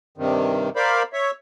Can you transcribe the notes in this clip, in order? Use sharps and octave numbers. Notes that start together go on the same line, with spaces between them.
G2 C3 D#3
A#4 C5 D5 F5 B5
C#5 E5